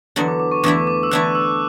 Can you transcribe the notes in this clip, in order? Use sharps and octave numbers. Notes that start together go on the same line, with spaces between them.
E2 D3 F#3
D6
D6
C#6
E2 D3 A3 E4 D6
D6
E6
E2 D3 A3 E4 F#6
E6